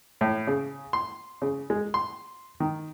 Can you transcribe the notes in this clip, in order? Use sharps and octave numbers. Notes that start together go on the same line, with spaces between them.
A2
C#3
C6
C#3
G#3
C6
D#3